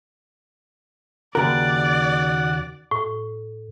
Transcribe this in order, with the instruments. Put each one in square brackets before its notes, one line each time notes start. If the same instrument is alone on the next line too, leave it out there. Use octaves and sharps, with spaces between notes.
[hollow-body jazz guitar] D#2 C#3 A#4 [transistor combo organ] F#4 F#5 [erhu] D5
[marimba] A2